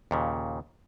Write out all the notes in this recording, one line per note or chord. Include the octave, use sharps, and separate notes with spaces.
D#2 A#2 C#3